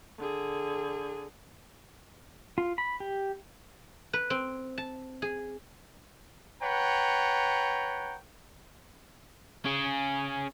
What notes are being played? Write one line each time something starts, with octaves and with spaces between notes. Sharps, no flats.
D3 G#4
F4
B5
G4
B4
C4
A5
G#4
B4 C#5 F#5 G5 A#5
C#4 G#4